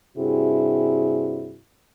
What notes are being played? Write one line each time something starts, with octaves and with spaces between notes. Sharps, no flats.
G2 C3 E4 F#4 G#4